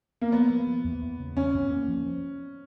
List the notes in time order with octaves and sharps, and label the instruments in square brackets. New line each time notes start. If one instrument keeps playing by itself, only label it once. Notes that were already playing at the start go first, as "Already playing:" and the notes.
[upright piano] A#3
[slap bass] F3 [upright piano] B3
[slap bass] F3
F3
E2
E2
C#3
[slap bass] E2 [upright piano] C#4
[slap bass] E2
A#3
F3
F3